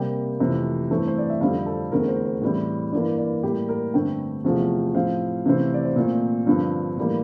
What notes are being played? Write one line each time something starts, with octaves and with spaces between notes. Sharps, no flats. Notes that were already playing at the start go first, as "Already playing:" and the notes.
Already playing: C3 G3 A#3 G5
F2 C3 E3 A3
G2 E3 A3 C4
C5
D5
E5
F2 D3 G3 C4 F5
A4
E2 D3 A3 C4 A#4
C5
C5
A2 E3 G3 C4
G2 E3 A#3 D5
D5
A2 G3 A#3 G4
A#4
G2 D3 A3 C4 G5
E2 C3 F3 A3
A2 F3 C4 F5
C3 E3 A3 C4
D5
C5
A#2 A3 C4 A#4
G2 D3 F3 C4
A2 E3 G3 A#3